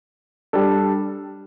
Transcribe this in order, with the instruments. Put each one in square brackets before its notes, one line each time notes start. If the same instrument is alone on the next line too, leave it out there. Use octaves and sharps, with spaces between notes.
[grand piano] G3 D4 A4